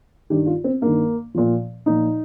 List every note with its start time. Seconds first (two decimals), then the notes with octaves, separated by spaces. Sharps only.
0.30 G2 D#3 G4
0.47 F4
0.64 C4
0.81 G2 D#3 A#3
1.34 A#2 F3
1.86 A#2 F3 D#4